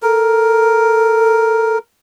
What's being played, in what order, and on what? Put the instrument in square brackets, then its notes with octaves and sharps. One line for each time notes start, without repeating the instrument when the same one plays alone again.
[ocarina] A4 [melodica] A#4